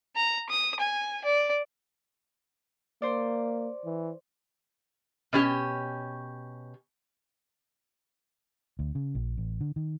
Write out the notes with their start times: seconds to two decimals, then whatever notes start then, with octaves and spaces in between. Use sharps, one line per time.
0.16 A#5
0.50 D#6
0.80 G#5
1.24 D5
3.02 A#3 C5 D5
3.85 E3
5.33 B2 C#4 G4
8.79 D2
8.95 C#3
9.15 A#1
9.38 A1
9.61 D3
9.76 D#3